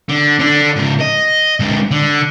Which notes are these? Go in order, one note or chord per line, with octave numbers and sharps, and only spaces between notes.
D3
D3 D4
G#2 C#3
D#5
D3 G#3
D3